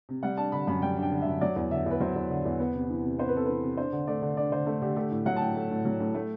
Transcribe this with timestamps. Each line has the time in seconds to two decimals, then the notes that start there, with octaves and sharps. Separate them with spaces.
0.09 C3
0.23 G3 F#5
0.37 D4 A5
0.52 D3 B5
0.67 F#2 B5
0.82 G3 G5
0.97 D4
1.03 G5
1.12 D3
1.22 F#2 E5
1.41 F#3 D5
1.56 E2
1.71 D3 E5
1.86 E2 B4
2.00 F#3 C5
2.16 E2
2.30 D3
2.45 E2
2.60 B3
2.74 C3
2.90 E3
3.04 C3
3.19 B3 C5
3.28 B4
3.34 C3 A4
3.45 E3 B4
3.63 C3
3.77 D4 C5
3.93 D3
4.07 A3 D5
4.22 D3
4.37 D4 D5
4.52 D3 C5
4.67 A3 A4
4.82 D3 G4
4.96 A3 G4
5.11 A2
5.26 F#3 F#5
5.36 A5
5.40 A2 G5
5.55 A3
5.70 A2
5.85 F#3
6.00 A2
6.14 A3